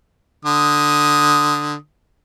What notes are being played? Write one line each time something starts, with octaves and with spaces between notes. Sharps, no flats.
D3 D#6